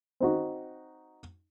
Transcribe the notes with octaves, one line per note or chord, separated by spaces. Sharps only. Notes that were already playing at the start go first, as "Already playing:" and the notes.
C4 D#4 F#4